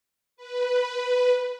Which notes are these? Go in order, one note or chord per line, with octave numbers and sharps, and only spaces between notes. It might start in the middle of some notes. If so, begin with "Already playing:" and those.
B4